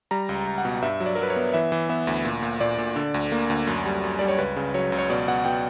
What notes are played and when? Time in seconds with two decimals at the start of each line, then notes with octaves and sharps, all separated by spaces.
0.11 G3 A#5
0.29 C#2
0.47 C#2
0.58 F#5
0.65 B2
0.82 G2 E5
1.00 F#3
1.06 D5
1.15 A#4
1.18 F#3 B4
1.30 C#5
1.36 B3
1.54 E3 E5
1.72 E3
1.89 B3 E5
2.07 D2
2.25 A#2
2.42 A#2
2.61 A#2 D5
2.78 A#2
2.96 D3
3.14 D2
3.32 A#3
3.50 D2
3.67 F#2
3.86 G3
4.04 F#2
4.19 G3 D5
4.28 C#5
4.38 C#2 B4
4.56 C#3
4.74 F#3 C#5
4.92 C#2
4.99 C#5
5.09 B2 D5
5.28 B2 F#5
5.45 B2 G5